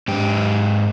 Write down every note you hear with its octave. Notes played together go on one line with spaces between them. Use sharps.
G#2 G4